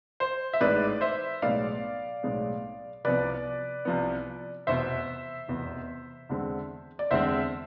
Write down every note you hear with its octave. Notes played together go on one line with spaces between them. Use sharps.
C5
E5
A1 G#2 G#3 B4 D5
C5 E5
B1 A2 G#3 B3 D5 F5
B1 A2 G#3 B3
C2 C3 F3 B3 B4 D5
C2 C3 F3 B3
F1 E2 B2 B3 C5 E5
F1 E2 B2 B3
E2 D3 G#3 C4
D5
E2 D3 G#3 C4 C5 E5